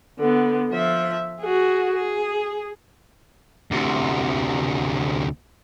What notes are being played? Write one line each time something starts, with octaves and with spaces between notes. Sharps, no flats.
D3 B3
F3 E5
F#4 G#4
G#4
D2 C3